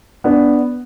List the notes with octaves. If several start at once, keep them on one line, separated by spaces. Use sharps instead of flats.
B3 D4